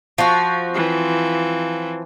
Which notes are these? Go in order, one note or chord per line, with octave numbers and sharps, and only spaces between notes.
F3 F#4
E3 C4